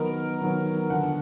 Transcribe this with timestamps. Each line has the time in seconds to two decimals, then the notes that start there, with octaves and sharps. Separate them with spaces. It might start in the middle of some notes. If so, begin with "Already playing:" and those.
Already playing: D#3 F#3 B3 A#4
0.41 D#3 F#3 B3
0.90 D3 F3 B3 F#5